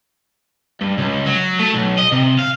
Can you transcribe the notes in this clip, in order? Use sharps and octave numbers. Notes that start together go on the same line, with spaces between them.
G2
C#2
F#3
A3
B1
D#5
C3
F5